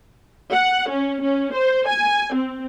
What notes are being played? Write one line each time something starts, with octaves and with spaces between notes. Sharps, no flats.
F#5
C#4
C#4
C5
G#5
C4